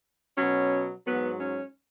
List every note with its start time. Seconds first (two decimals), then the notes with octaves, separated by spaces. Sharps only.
0.37 B2 F#3 C#4
1.06 G#2 F#3 B3
1.39 C#4